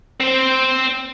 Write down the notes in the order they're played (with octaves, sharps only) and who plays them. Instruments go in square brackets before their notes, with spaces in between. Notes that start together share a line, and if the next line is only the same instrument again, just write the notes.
[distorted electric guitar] C4 C5